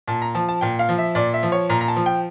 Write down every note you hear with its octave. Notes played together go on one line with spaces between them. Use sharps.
A#2 A5
A#5
F3 A5
A5
A#2 G5
F5
F3
E5
A#2 D5
E5
F3
C#5
A#2 A#5
A#5
A5
F3
G5